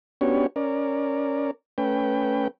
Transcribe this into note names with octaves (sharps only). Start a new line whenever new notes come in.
B3 C#4 D4 F#4 G4 C#5
C#4 A#4 D5
A3 C#4 B4 G5